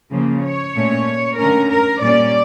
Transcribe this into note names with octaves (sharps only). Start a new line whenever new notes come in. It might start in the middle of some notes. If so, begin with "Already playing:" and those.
C#3 F3 A#3
C#5
A#2 A3 C#4
D3 A3 C#4 A#4
A#4
A#2 G3 A#3 C#4 D5